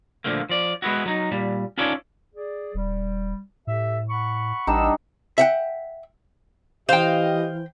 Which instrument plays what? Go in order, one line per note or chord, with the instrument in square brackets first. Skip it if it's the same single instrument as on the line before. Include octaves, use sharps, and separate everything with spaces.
[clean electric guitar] A#2 D3 F3 A3 A#3
F3 D5
G#3 B3 E4 F#4
F#3 D#4
A#2 G3
C#4 D#4 F4 A4 C#5 D5
[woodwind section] G#4 D5
[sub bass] D#1 [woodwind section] G3
[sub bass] A2 [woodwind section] G4 A4 E5
[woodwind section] F#5 B5 C#6
[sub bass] A1 [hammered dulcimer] G3 D4 D#4 [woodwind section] B4 F#5 E6
[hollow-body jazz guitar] E5 F#5 G5
[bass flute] E3 [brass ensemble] G4 D#5 [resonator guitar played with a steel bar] C5 G5 [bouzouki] F5